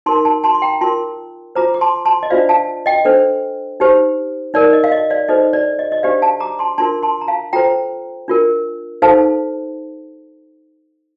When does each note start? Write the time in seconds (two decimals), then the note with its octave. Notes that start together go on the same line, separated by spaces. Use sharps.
0.06 D#4 A#4 A5 C6
0.25 A5 C6
0.44 A5 C6
0.55 C6
0.62 G5 A#5
0.81 F4 A#4 A5 C6
1.55 F4 C5 A#5 D6
1.74 D6
1.81 A5 C6
2.05 A5 C6
2.23 D#5
2.30 D4 F4 C5 D5 F5
2.49 F5 A5
2.86 D#5 G5
3.05 D4 A4 C5
3.80 D#4 G4 C5
4.54 D#4 A#4 D5
4.73 D#5
4.84 F5
4.92 D#5
5.10 D5 F5
5.28 D#4 A4 C5 D#5
5.53 D5
5.79 D#5
5.92 D#5
6.03 D4 G4 C5 D5 F5
6.22 F5 A5
6.40 A#5 D6
6.59 A5 C6
6.78 D4 F4 A#4 A5 C6
7.02 A5 C6
7.21 A#5
7.28 F5 A5
7.53 F4 A4 C5 G5 A#5
8.28 D4 F4 A#4
9.02 D#4 A4 C5 F5 A5